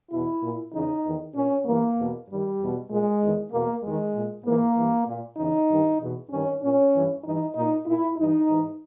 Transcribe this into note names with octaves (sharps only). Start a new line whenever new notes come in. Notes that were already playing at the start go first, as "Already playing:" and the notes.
E2 B2 E4
A#2
E2 C#3 E3 D#4
E2 D#3
A#2 C#4
G2 E3 A#3
E2 B2
G2 D#3 G3
E2 B2
A#2 G#3
E2 D#3
E2 B2 A#3
E2 D#3 G#3
A#2
G#2 E3 A#3
G2 E3
A#2
E2 C#3 E3 D#4
G2 D#3
E2 B2
G2 D#3 C#4
A#2 C#4
G2 E3
G2 E3 D#4
A#2 D#4
A#2 E4
G2 E3 D#4
G#2 E3